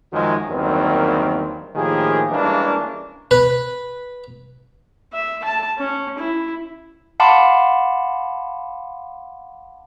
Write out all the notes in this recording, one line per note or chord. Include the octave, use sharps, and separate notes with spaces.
F#2 D#3 F3 F#3 G#3
E2 G2 D#3 F#3 A#3 C4
A2 D#3 F3 A#3 G4 G#4
E3 G3 G#3 A#3 C#4 D4
B4
E5
A5
C#4
E4
F5 F#5 A5 B5 C6 D6